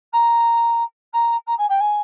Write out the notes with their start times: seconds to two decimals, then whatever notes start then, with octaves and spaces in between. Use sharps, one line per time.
0.12 A#5
1.13 A#5
1.46 A#5
1.58 G#5
1.69 G5
1.80 G#5